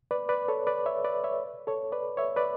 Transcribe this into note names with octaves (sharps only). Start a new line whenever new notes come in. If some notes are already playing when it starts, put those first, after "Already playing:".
B4 D5
B4 D5
A4 C#5
B4 D5
C#5 E5
B4 D5
C#5 E5
A4 C#5
B4 D5
C#5 E5
B4 D5